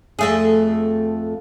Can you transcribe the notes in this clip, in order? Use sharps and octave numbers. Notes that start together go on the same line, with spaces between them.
F2 A3 G#4